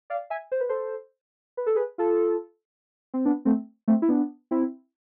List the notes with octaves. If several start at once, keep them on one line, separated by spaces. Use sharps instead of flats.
D5 F5
E5 G#5
C5
B4
A4 C5
B4
A4
G#4 B4
F4 A4
C4
B3 D4
A3 C4
A3 C4
E4
B3 D4
C4 E4